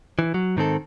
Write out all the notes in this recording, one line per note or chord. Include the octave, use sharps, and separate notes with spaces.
E3
F#3
G#2 D#3 C4 A4